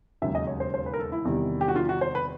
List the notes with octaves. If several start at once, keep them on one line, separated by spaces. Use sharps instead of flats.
E1 D#2 C#3 F#3 E5
D#5
C#5
C5
C5
B4
A#4
A4
E4
E2 C3 D#3 G3
G4
F#4
F4
F#4
C5
B4